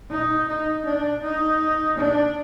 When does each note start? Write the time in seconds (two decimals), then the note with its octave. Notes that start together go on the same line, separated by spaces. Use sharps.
0.10 D#4
0.48 D#4
0.85 D4
1.23 D#4
1.98 D4